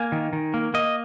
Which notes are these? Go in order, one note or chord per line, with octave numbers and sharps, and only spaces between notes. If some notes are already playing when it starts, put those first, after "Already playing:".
Already playing: A#3 G#5
D#3
D#3
A#3
A#3 D#5